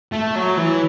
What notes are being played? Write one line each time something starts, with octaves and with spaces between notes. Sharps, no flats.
A3
F#3
E3